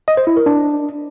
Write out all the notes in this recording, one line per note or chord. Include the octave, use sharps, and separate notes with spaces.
D#5
C5
E4
A#4
D4